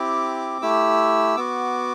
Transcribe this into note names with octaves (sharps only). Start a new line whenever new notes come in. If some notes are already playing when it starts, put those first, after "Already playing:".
Already playing: C4 E4 G4 D6
A3 E4 G4 E6
B3 F#4 D6